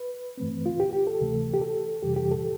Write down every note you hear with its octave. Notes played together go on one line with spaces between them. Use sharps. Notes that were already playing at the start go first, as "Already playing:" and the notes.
Already playing: B4
G2 E3 A3 C4
F4
G4
G4
A4
D2 C3 E3 A3
G4
A4
F2 C3 E3 G3 G4
G4
A4